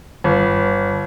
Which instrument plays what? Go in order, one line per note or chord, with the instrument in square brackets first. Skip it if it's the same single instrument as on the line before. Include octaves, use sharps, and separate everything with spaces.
[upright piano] G1